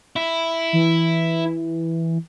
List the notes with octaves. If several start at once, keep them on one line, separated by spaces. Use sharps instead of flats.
E4
E3